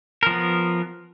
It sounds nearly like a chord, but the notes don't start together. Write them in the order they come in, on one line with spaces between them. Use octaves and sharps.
A#4 F3 B3